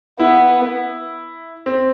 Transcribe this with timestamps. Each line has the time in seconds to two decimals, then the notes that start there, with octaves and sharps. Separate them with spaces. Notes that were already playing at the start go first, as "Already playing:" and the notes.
0.19 B3 E4
1.66 C4